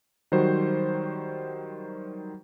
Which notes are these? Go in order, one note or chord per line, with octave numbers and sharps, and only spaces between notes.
D#3 F#3 G3 F#4 C5